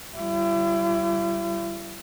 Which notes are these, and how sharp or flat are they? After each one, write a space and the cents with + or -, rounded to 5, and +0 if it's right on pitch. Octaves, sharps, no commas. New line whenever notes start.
G3 -30 E4 +40